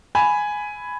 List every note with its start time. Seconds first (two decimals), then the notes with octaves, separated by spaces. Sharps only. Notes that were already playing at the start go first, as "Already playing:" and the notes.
0.15 G#5 B5